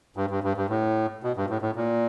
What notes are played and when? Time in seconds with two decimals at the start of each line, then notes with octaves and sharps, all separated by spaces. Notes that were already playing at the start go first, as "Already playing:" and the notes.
0.17 G2
0.30 G2
0.44 G2
0.57 G2
0.69 A2
1.23 B2
1.37 G2
1.50 A2
1.62 A2
1.76 A#2